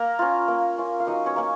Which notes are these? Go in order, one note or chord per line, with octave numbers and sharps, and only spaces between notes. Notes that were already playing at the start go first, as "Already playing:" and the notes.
Already playing: A#3 A#4 A#5
C#4 F4
A#3
C#4 F4
F5
F#3 D#4 D#5
C#4 C#5
A#3 C#4